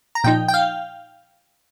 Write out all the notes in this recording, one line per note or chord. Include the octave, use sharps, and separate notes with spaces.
A#5
A#2 F3 D#4 G5
G5
F5